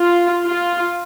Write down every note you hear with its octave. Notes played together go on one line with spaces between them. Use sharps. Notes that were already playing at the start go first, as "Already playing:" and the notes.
Already playing: F4
F4